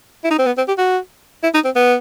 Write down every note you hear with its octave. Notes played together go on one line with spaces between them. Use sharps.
E4
D#4
C4
B3
C4
G4
F#4
E4
D#4
C4
B3